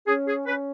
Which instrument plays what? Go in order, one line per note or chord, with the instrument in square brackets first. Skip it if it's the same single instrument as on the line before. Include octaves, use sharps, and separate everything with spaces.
[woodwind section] C#4 G#4
G#4
C#4 B4